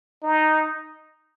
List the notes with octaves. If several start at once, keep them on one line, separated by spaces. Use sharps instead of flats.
D#4